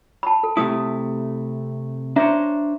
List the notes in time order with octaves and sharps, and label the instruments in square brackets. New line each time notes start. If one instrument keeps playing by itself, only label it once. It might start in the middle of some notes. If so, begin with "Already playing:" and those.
[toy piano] A5 B5
A4
[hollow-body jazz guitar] C3 A3 E4 [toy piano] D#6
[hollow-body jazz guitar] D4 C5 C#5 [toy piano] E5 A#5